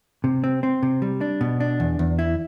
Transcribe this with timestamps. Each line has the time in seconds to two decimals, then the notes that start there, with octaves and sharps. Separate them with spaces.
0.24 C3
0.44 C4
0.63 C4
0.83 C3
1.02 G3
1.21 D4
1.41 B2
1.60 D4
1.80 E2
1.99 E2
2.19 E4